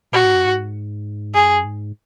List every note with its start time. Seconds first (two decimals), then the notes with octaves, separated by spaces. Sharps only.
0.12 A#2 F#4
0.24 G#2
0.35 F#2
0.45 G#2
1.34 F#2 G#4
1.64 G#2